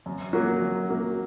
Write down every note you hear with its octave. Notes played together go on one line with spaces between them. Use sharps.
F#2
F#3 A#3 F#4
F#2
F#3 A#3 F#4